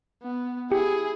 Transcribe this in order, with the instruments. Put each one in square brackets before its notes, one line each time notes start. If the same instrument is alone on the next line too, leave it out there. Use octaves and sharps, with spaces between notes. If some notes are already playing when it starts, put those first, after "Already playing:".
[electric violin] B3
[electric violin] E4 G#4 [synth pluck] G4